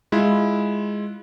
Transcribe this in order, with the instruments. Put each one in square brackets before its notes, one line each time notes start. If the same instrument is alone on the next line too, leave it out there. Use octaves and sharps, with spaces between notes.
[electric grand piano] G#3 E4 F4